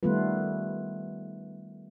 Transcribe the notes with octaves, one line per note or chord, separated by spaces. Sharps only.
D#3 G3 A3 B3 F4 B4